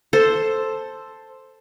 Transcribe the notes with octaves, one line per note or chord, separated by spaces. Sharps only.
A4 C5